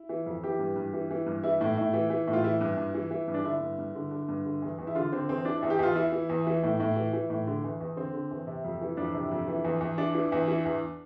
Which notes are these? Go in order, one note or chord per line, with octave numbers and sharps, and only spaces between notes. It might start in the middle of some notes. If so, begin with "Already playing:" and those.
Already playing: E4
E3
F2
E3 G4
G2
G2
E3
E3
G2
E3 E4
A2
A2
E3
E3
A2
F4
E3 E4
G2
G2
E3
E3
G2
D4
D3 E4
G2
G2
D3
D3
G2
D3
E2
E2
E4
D3 F4
D3 C4
E2 C4
E3 D4
E4
E2
G4
E2 F4
E3 E4
E3
E2
E3
A2
A2
E3
E3
A2
D3
E2
E2
D3 C4
D3
E2
C3
F2
E3
F2 D4
C3
F2
E3
E2
E2
E3 D4
E3
E2
E3
E2